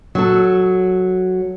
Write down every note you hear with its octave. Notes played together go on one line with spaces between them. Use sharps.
F#3 A4